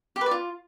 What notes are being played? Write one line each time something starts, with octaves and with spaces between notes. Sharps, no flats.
G4
B4
D5
F4